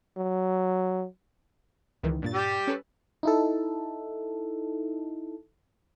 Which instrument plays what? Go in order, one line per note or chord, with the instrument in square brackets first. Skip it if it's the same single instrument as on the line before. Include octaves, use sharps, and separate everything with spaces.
[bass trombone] F#3
[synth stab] C#2 D#3 E3
G2 A#2 A6
[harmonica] G3 G4
[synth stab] C#4 A4 B4
[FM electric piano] D#4 E4 A4